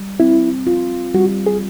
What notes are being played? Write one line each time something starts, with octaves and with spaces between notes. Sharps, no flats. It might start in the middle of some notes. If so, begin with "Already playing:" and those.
Already playing: G3
C4 E4
F4
G3 F#4
G#4